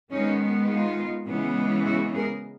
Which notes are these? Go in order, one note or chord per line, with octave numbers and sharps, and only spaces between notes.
D#3 G#3 B3 C#4 D#4
D#4 F4
C#3 E3 G#3 B3
E4 F#4
G#4 A#4